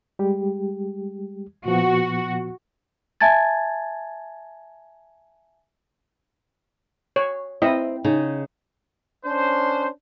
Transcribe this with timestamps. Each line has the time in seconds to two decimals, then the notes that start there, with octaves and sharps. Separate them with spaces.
0.19 G3 G#3 G4
1.66 A#2 F3 B3 F#4
3.21 E5 G#5 A5 G#6 A6
7.16 C#5
7.62 C4 E4 D#5
8.04 C#3 D#4 G#4
9.25 C#4 D4 C5